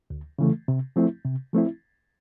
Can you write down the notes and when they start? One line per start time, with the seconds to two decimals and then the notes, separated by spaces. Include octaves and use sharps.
0.10 D2
0.39 C#3 E3 A3
0.68 C3
0.96 F3 A3 C4 E4
1.25 C3
1.53 F3 A3 C4 E4